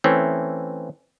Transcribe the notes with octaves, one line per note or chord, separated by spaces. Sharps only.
E3 A3 C4 C#4